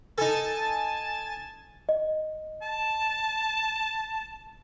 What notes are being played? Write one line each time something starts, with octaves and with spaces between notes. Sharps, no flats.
D#4 A4 G#5 A5 A6
D#5
A5